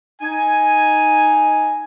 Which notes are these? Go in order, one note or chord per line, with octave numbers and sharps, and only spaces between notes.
D#4 G#5